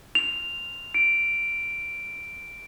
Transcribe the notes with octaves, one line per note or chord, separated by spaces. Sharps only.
F7
D7